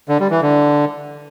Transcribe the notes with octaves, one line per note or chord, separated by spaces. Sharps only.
D3
G3
E3
D3